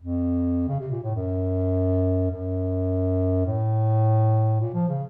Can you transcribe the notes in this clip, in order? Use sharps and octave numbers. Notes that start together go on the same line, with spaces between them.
F2
C#3
C3
A#2
A2
F#2
F#2
A2
A#2
F3
C#3